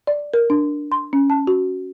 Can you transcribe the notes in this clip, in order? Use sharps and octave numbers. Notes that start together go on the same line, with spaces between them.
D5
A#4
D4
C6
C#4
A5
F#4